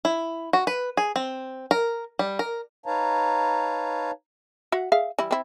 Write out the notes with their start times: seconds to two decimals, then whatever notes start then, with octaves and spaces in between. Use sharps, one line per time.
0.05 E4
0.53 F#4
0.67 B4
0.97 G#4
1.16 C4
1.71 A#4
2.19 G3
2.39 A#4
2.86 D#4 B4 C#5 F5 A5 A#5
4.72 F#4 E5 F#5
4.92 G#4 E5 F5
5.19 E3 G3 E4
5.31 C4 E4